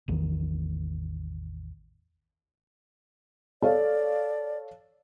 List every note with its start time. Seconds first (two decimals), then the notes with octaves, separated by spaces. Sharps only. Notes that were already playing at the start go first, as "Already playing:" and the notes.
0.08 A1 E2 D#3
3.62 A4 C#5 D5 F5